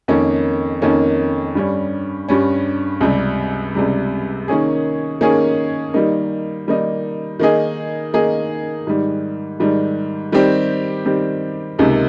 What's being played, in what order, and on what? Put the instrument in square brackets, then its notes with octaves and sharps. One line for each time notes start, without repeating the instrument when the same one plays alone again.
[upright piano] F2 D#3 A#3 C#4
F2 D#3 A#3 C#4
G2 G3 C#4
G2 G3 C#4
C#2 C3 G3
C#2 C3 G3
D#3 A#3 C#4 G#4
D#3 A#3 C#4 G#4
D#3 G3 A#3 D#4
D#3 G3 A#3 D#4
D#3 A#3 D#4 G#4
D#3 A#3 D#4 G#4
G#2 D#3 G3
G#2 D#3 G3
D#3 G3 C4 G4
D#3 G3 C4 G4
C#2 C3 D#3 A#3 D#4